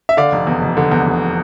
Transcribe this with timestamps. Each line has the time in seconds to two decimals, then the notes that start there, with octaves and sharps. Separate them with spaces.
0.09 E5
0.17 D3 D5 F5
0.32 F1
0.47 E2
0.62 F1
0.77 D3
0.92 E2
1.06 F1